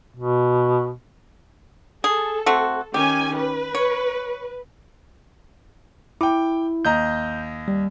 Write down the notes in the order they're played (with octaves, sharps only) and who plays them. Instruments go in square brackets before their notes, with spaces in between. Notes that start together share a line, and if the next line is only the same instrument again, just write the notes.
[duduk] B2
[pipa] G#4 [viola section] A4
[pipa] A3 C4 F#4
[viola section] D#3 C#4 G#5 [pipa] G4
[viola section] B4
[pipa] C#5
[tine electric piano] E4 [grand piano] G5 D6
[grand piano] D#2 D#5 A#5 [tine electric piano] G6
[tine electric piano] G3